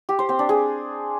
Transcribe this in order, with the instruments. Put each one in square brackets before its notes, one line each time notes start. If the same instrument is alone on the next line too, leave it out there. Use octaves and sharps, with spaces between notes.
[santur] G4
C5
C4
D4
G#4